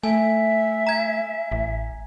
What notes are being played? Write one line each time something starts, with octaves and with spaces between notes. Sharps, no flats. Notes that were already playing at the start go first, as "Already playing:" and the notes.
A3 E5 G#5
A#5 G#6
A1